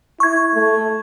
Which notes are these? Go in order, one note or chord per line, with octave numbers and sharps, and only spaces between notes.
E4 C#6 G#6
A3